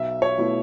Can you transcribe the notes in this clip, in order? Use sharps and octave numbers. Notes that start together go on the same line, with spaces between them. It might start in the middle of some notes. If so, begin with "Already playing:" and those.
Already playing: B1 E5
C#5
B2 A3 E4